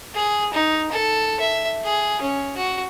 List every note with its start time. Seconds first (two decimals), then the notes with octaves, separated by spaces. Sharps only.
0.14 G#4
0.54 D#4
0.92 A4
1.40 E5
1.84 G#4
2.21 C#4
2.57 F#4